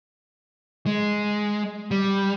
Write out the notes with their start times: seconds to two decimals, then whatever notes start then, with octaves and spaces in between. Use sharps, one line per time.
0.86 G#3
1.91 G3